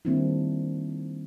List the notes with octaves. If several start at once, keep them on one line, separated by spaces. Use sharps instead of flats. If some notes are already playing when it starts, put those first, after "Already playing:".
D#3 G3 A#3 C4 D4 E4